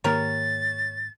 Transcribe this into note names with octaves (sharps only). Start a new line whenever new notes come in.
G#2 D#3 A#3 G4 A#4 C#5 A6